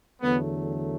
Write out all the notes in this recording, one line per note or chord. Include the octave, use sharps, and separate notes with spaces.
E2 D3 F#3 A3 B3